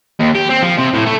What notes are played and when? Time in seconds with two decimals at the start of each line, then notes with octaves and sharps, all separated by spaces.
0.19 D#2
0.35 G4
0.49 C4
0.62 F3
0.78 C3
0.94 A2
1.06 A3